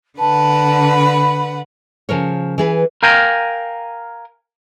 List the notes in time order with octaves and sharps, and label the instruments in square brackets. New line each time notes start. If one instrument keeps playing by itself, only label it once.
[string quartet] D3 B4 F#5 [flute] A5
[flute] B5
[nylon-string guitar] C#3 F3 A#4 C#5
E3 G#4 B4
[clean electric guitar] A#4 F5 G5 G#5 A#5